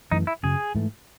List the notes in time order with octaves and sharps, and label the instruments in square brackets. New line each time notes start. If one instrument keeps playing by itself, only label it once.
[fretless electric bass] F#2 E3 A3 [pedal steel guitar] D#4
[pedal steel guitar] E4
[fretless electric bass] F#2 C#3 F#3 [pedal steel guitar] G#4
[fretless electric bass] G#2 E3 A3